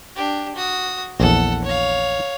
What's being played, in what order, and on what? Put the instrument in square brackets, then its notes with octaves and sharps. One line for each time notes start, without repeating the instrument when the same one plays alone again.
[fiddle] D4 G4
F#4 D#6
[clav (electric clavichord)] A#1 E2 [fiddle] A4 F#5
[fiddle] C#5 F5